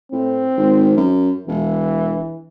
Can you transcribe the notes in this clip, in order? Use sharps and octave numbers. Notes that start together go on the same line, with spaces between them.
A2 C4
G#1
F#2
E1 E3